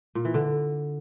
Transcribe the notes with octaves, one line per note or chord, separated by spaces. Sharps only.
A#2
E3
D3